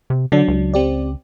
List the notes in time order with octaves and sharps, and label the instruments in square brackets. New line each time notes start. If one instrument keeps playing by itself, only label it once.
[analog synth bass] C3
[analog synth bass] D3 [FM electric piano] F#3 D4
[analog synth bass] C#2
[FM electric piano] C4 G4 D5